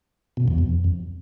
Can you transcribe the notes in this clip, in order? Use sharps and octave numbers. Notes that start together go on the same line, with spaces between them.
B2
E2
F2